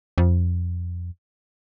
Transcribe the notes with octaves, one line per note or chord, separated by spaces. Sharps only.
F2